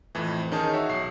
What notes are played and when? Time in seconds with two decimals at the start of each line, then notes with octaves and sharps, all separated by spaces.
0.15 F2 A2 E3
0.52 D#3 C#4 D#4 G#4 A5 D#6
0.74 F#4 C#5 E5
0.89 B1 C#6 C7